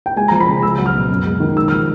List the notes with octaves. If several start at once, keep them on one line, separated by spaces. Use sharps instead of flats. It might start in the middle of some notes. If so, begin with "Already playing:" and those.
G5
G#3 G#5
F3 A#5
B5
C#3
C#2 E6
F#3
F6
B2
F#2
G#3
D#3
G#3 E6
F3 F6